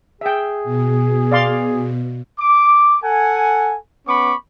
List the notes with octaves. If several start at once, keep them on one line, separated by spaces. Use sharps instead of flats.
G#4 E5 G5
B2
D5 F5 C6
D6
A4 F#5 G#5
B3 C#4 B5 C#6 D6